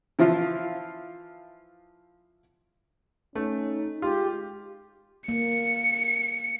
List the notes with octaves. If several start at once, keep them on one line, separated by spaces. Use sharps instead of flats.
E3 F3 E4 F4
A3 C#4 D#4
G#3 F4 G4
A#3 C#7